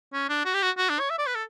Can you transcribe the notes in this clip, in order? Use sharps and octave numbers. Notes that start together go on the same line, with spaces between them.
C#4
D4
F#4
G4
F#4
F#4
D4
C#5
E5
D5
B4
A4